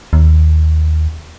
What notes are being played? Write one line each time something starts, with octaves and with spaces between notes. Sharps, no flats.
D#2